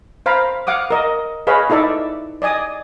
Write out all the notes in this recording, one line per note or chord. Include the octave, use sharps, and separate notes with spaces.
C5 F5 A#5 B5
F5 F#5 D6 D#6
A#4 D#5
G#4 B4 C#5 D#5 F5 B5
D#4 E4 A4 D5 E5
D5 D#5 G#5 D#6